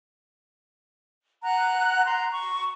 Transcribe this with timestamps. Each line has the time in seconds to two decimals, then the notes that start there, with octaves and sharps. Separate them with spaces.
1.43 F#5 A#5 F#6
2.05 A#5 C6
2.31 C#6